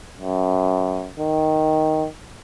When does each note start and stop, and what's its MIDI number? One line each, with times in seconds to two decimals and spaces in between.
0.19 1.10 42
1.19 2.07 51